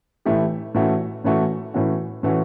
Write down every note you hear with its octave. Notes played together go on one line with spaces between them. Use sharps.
A2 E3 A3 E4 G4
A2 E3 A3 C#4 F#4
A2 E3 A3 C#4 F#4
A2 E3 A3 C#4 F#4
A2 E3 A3 C#4 F#4